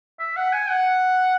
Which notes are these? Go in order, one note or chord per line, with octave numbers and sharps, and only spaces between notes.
E5
F#5
G#5
F#5